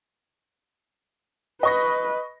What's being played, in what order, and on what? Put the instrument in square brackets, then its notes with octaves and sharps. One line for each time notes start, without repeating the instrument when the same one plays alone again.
[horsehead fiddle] B4 [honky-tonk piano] D#5 C#6 A#6